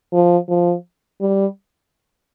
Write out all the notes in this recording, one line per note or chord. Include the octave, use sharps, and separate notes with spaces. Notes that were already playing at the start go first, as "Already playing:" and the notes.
F3
F3
G3